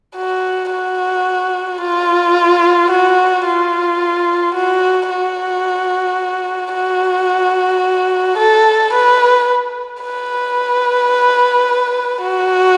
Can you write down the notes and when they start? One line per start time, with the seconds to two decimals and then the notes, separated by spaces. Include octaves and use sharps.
0.16 F#4
0.71 F#4
1.81 F4
2.90 F#4
3.46 F4
4.55 F#4
5.10 F#4
6.74 F#4
8.38 A4
8.93 B4
10.03 B4
12.22 F#4